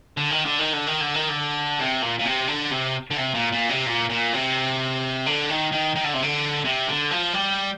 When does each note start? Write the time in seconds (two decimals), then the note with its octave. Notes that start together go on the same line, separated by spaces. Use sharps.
0.17 D3
0.31 D#3
0.45 D3
0.59 D#3
0.73 D3
0.86 D#3
1.00 D3
1.14 D#3
1.28 D3
1.79 C3
2.02 A#2
2.19 A#2
2.25 C3
2.48 D3
2.71 C3
3.11 D3
3.17 C3
3.34 A#2
3.52 A#2
3.70 C3
3.87 A#2
4.10 A#2
4.33 C3
5.26 D3
5.49 D#3
5.72 D#3
5.96 D#3
6.04 D3
6.14 C3
6.23 D3
6.65 C3
6.88 D3
7.11 F3
7.34 G3